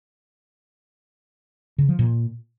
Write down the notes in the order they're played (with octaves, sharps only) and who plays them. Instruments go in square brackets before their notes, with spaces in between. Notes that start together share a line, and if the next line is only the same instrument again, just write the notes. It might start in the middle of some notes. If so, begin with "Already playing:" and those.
[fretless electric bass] C#3
F3
A#2